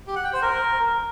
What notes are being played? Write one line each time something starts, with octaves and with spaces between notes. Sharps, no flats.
G4
F#5
G5
C5
A#4